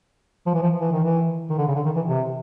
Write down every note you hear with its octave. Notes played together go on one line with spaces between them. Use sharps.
F3
E3
F3
E3
D#3
E3
D#3
D3
C#3
D3
D#3
E3
C3